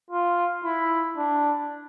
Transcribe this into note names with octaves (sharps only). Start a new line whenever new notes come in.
F4
E4
D4